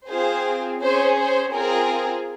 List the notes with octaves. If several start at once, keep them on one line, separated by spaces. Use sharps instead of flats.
C4 F4 G#4 C5
C#4 G#4 C5
C5
C4 F4 G#4 A#4